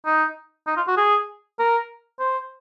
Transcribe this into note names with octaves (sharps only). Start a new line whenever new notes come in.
D#4
D#4
F4
F#4
G#4
A#4
C5